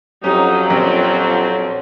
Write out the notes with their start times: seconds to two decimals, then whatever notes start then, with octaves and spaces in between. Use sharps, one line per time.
0.24 F2 F#3 C#4 D#4 G4
0.69 A#1 C4 C#4 G4